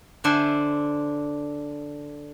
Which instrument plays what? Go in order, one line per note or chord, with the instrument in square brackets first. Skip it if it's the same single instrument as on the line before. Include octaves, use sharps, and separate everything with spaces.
[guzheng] D3 D4 C5 E5 G#5